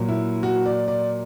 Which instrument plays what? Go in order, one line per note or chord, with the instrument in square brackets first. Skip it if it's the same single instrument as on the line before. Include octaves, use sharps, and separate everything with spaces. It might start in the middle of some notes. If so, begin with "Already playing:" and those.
Already playing: [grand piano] A#2 F#3
E4
F#4
D5
D5